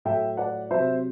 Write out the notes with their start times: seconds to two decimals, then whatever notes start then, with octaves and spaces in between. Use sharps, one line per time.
0.05 A2 F#3 E5 G5
0.37 D5 F#5
0.71 C3 F#3 C5 E5